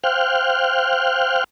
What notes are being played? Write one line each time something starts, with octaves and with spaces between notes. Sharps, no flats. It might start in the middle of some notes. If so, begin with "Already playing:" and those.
C5 F5 G5 F6 F#6